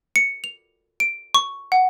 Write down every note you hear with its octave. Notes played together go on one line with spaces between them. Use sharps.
C#7
F7
D7
C#6
F#5